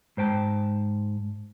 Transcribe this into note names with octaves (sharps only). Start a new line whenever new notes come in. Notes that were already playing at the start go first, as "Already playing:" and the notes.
G#2 C5 G5 A5